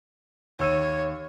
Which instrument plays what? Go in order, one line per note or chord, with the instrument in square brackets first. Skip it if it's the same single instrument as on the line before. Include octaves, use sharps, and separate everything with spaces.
[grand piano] D#2 E6 D#7 [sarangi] C#5